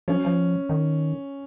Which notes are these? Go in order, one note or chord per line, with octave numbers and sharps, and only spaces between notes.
F3 C#4
F#3
F3
D#3